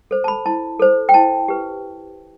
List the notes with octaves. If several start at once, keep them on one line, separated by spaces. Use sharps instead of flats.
A4 C5
A5
B5
E4 A5
A4 C5
G5
E4 A5
G4 B4